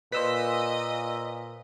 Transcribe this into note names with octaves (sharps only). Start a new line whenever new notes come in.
A#2 B4 C5 D#5 E6 B6